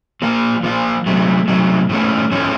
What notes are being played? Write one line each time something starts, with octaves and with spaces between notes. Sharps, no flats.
F3 A#3 F4
F3 A#3 F4
C3 F#3 A3
C3 F#3 A3
A2 F3 A3 C#4
A2 F3 A3 C#4